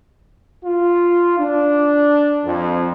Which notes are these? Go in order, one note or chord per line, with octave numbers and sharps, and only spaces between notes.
F4
D4
F2